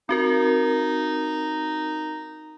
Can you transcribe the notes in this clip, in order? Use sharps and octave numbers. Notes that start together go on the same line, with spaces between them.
C4 D#4 F#4 A#4